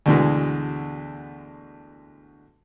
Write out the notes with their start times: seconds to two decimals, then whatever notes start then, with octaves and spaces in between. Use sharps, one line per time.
0.06 D2 B2 D3 E3 G#3